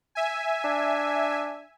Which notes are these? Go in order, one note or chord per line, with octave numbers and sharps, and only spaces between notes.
E5 G#5
D4